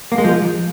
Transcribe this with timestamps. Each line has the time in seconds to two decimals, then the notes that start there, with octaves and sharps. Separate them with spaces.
0.12 A#3
0.18 G#3
0.24 F3